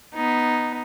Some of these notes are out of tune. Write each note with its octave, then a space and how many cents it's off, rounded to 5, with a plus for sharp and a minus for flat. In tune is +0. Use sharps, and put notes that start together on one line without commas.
B3 +0 D#4 +0